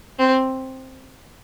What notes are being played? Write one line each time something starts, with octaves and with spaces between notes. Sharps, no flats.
C4